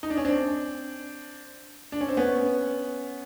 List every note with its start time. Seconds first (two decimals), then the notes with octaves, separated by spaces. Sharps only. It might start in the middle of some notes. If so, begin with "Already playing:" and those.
0.03 D#4
0.10 D4
0.17 C#4
0.25 C4 D4
1.92 D4
2.01 C#4
2.09 C4
2.17 B3 C#4